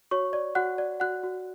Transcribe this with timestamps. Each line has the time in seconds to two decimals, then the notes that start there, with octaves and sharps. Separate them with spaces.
0.11 F#4 C#5 C#6
0.33 D5
0.55 F#4 F#5 F#6
0.78 D5
1.00 F#4 F#5 F#6
1.24 F#4